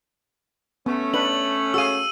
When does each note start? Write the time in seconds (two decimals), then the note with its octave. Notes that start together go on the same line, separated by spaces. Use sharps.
0.86 A3 B3 C#4
1.14 D4 B4 F#7
1.74 F#4 G#4 F5 E6 D#7